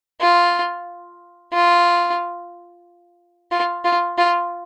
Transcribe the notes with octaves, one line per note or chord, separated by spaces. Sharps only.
F4
F4
F4
F4
F4